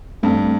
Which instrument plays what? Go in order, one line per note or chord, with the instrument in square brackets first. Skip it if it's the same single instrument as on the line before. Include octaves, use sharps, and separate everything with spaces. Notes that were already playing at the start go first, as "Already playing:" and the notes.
[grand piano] G2 [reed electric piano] A3 C4